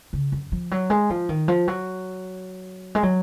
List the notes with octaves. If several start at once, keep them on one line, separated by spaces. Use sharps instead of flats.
C#3
F#2
F3
F#3
G#3
F3
D#3
F3
F#3
G#3
F#3